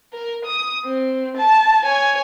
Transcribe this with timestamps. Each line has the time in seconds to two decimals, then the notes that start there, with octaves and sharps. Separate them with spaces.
0.13 A#4
0.45 D#6
0.85 C4
1.37 A5
1.85 C#5 G#5